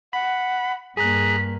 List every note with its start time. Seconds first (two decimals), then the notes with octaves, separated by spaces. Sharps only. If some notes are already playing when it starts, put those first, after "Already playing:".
0.13 F#5 B5
0.97 G2 A#3 G#4 A#5 F#6 B6